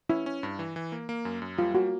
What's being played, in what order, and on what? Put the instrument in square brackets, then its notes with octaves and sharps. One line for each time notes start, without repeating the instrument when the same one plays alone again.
[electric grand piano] C#4 [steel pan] E4
[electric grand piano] C#4
G2
E3
E3
A#3
A#3
F#2
F#2
[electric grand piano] G3 [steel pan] F4
[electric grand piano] A#3 [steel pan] F#4